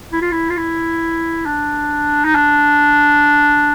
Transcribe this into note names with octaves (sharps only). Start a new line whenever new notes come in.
E4
F4
E4
F4
E4
D4
D#4
D4